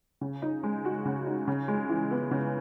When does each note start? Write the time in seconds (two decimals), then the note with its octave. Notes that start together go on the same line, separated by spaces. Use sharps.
0.21 C#3
0.42 D#4
0.63 G#3
0.85 F#4
1.05 C#3
1.26 D#4
1.48 C#3
1.68 G#3
1.89 E3
2.11 B3
2.31 C#3